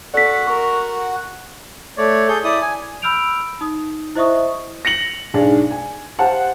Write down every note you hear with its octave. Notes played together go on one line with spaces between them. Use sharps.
F#4 A4 D5 F#5 B6
A#4 C#6
A3 C#5 D5
G#4 A4 G6
E4 D5 D#6
G#5
B5 E6 F6 G6 D7 F7
D#4 D#6
E4 C5 D#5 E5 C#6 D#6
A#6 C#7 F7 F#7
B1 G#2 D4 G#4 G#5
G#5
G4 C5 F5 F#5 A5